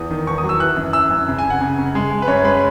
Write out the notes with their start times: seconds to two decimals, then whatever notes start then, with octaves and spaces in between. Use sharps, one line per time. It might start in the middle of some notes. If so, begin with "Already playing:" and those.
Already playing: E2 D#6
0.10 D#3
0.27 E2 C#6
0.38 D#6
0.44 F#3
0.49 E6
0.60 E3 F#6
0.77 F#2
0.93 E3 E6
1.10 F#2
1.28 C#3
1.38 G#5
1.44 C#3
1.50 F#5
1.61 C#3
1.78 C#3
1.95 G#3
2.11 G#3
2.22 B4
2.28 F#2 C#5
2.44 G#3 B4